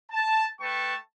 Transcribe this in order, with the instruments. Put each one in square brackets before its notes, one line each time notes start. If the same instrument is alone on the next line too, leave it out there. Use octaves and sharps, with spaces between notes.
[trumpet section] A5
A3 B4 G5 A5 C#6